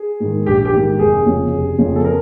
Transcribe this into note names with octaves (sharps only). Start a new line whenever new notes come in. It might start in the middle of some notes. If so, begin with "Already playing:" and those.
Already playing: G#4
G#2 D#3
A#1 G4
G4
G#2 D#3
F1 G#4
F2 C#3 F3
F1
F2 C#3 F3
A4
A#4